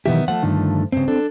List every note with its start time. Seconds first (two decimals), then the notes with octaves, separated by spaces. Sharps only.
0.06 B1 D#3 E3 B3 G4 E5
0.28 F3 A3 F#5
0.43 G2 D3 D#3
0.92 G2 C#3 C4
1.08 D4 A4